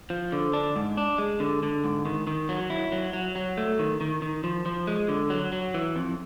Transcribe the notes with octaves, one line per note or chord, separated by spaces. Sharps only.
F3
D3
D4
G#2
D4
G#3
D3
D3
G#2
D#3
D#3
F#3
E4
F#3
F#3
F#3
A3
D#3
D#3
D#3
F3
F3
G#3
D3
F#3
F#3
E3
F2